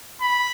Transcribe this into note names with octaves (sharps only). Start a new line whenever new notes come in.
B5